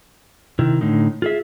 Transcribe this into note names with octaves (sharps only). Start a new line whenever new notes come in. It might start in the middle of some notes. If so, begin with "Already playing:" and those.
C3 D#3 E4
A2 D3 D#4
F4 G#4 E5